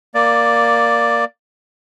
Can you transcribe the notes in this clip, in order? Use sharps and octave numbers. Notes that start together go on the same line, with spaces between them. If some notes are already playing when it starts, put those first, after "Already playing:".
A#3 D5